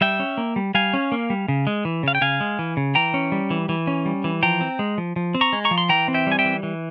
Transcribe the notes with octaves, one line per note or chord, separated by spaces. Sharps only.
G3 E5 G5
C#4
A#3
G3
G3 F5 G#5
C#4
A#3
G3
C#3
G#3
E3
C#3 F5
G5
C#3 F5 G#5
G#3
E3
C#3
E3 G5 A#5
C#4
G3
E3
E3
C#4
G3
E3
F3 G5 A#5
C4
G#3
F3
F3
C4
A#5 C#6
G#3
A#5 C#6
F3
C6
E3 G5 A#5
C4
E5 G5
G3 G#5
E5 G5
E3
E3